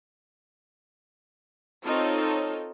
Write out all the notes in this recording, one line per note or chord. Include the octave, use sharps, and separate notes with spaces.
C4 D#4 F4 A4 C#5